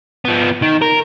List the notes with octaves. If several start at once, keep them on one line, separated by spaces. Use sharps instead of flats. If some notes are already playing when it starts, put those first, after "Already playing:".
F3 B3
D#3
A#4